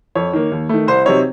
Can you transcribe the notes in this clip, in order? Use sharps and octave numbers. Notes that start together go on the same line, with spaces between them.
F2 C#5
D#3 A#3
D#2
D#3 A3
C2 C5
C3 F#3 C4 D#4 C#5